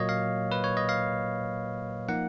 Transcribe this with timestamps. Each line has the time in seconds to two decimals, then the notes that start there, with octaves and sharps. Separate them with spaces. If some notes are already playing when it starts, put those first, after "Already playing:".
Already playing: A#2 F#3 A#3 C#5 D#5
0.09 F5
0.52 B4
0.64 C#5
0.77 D#5
0.89 F5
2.09 F3 A#3 D#4 F#5